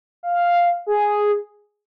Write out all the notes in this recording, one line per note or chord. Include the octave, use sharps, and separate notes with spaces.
F5
G#4